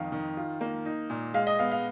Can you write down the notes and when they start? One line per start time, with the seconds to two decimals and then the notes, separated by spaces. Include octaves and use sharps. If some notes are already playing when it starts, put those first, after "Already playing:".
Already playing: F2 D#3 F5
0.12 D#3
0.37 F4
0.61 A#3
0.85 D#4
1.10 A#2
1.34 G#3 F5
1.47 D#5
1.59 B3 F5
1.71 F5